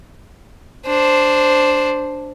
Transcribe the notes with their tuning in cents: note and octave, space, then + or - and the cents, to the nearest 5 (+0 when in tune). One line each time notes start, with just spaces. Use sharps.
D4 +0 C5 +0